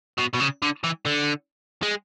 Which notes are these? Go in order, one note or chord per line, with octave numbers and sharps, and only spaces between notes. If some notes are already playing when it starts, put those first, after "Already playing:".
B2
B2
C#3
D3
E3
D3
G#3